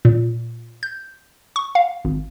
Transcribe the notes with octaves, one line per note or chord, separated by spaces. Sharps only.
A#2
G6
C#6
F5
G#1